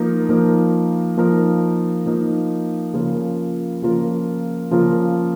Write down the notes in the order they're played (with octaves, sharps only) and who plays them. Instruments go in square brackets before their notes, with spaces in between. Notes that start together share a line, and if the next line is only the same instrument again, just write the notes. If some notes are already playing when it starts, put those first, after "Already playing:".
Already playing: [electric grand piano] F3 A#3 D#4 A#4
F3 A#3 D#4 A#4
F3 A#3 D#4 A#4
F3 A#3 D#4 A#4
C#3 F3 A#3 F4 A#4
C#3 F3 A#3 F4 A#4
C#3 F3 A#3 F4 A#4